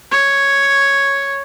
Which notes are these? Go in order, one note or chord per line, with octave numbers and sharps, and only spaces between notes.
C#5